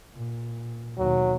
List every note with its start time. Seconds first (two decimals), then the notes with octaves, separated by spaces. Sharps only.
0.13 A#2
0.98 D#2 B2 F#3